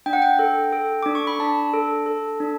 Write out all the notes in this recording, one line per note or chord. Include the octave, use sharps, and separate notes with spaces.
D4 G5
F#5
G5
A4
A4
D4 D6
C#6
B5
D4 A5
A4
A4
D4